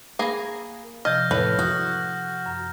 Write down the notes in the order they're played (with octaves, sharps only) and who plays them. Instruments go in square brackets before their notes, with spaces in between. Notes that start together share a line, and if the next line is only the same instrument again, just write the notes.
[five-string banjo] A#3 G#4 [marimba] B5 A#6
[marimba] C3 F3 [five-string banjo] D#5 [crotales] F6 G6 A#6
[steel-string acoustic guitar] A2 [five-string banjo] B4
[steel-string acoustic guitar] F#4 [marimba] D#6
[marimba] F#2